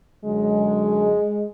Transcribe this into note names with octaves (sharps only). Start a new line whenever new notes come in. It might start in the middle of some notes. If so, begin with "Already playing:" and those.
F#2 D3 F#3 G#3